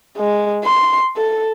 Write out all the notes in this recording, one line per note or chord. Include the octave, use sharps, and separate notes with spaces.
G#3
C6
A4